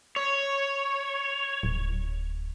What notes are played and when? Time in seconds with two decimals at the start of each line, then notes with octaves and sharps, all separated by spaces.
0.16 C#5
1.63 D1